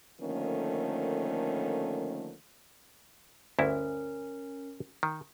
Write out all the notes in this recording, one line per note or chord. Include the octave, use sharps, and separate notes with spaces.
D3 D#3 F3 A3 A#3 C#4
D2 G2 C#4 E4 A#4
D#3